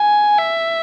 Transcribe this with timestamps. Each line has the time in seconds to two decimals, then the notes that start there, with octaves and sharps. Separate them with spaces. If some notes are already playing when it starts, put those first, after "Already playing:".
Already playing: G#5
0.38 E5